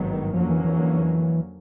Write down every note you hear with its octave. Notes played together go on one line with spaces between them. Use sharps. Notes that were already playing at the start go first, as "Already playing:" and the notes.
Already playing: G#1 G2 D#3 F#3 B3
F2 D3 F3 F#3 A#3 C#4
E3
E3